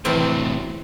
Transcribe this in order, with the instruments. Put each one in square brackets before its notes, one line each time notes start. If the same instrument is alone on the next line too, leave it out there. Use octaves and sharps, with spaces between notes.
[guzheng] E2 C4 [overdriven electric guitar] A2 C3